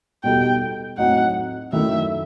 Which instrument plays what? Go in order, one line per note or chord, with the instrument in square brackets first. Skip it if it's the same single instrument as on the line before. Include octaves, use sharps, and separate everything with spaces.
[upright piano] B2 G3 D#4 A4 [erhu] G5
[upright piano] A2 F#3 C4 D#4 [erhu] F#5
[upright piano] F#2 D#3 A3 E4 [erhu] E5